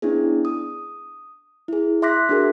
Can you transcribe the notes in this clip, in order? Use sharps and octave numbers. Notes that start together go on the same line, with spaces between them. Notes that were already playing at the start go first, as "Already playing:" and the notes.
B3 C#4 D4 E4 G#4
D#6
E4 G#4
E5 C6 D6 F#6 A#6 B6
D4 F#4 G#4 A#4